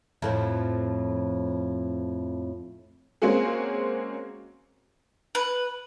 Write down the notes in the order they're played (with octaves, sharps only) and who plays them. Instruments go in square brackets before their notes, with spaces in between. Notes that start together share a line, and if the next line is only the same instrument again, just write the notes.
[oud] F2 A2 F3
[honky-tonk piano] G#3 A#3 C4 C#4 F#4 G#4
[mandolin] B4